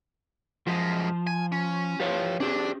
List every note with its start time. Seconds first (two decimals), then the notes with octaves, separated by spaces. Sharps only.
0.67 F#2 F3 G#3
1.27 G#5
1.52 C#4
2.00 F3 G4 B4 C#5
2.40 C#4 D4 G4 G#4